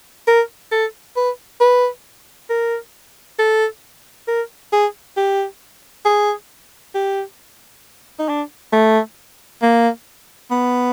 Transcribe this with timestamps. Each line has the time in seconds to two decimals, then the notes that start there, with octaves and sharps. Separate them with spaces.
0.27 A#4
0.72 A4
1.16 B4
1.61 B4
2.50 A#4
3.39 A4
4.28 A#4
4.73 G#4
5.17 G4
6.05 G#4
6.95 G4
8.19 D#4
8.29 D4
8.73 A3
9.62 A#3
10.51 B3